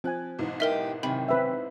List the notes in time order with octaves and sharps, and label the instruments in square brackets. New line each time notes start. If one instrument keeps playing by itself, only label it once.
[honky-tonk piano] F3 F#6 [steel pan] C4 G#5
[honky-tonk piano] B1 G#2 E3
[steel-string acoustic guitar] D#4 G4 [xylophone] A#4 E5
[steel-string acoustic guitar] F#2 C3 D#3 [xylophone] B5
[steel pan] C4 B4 E5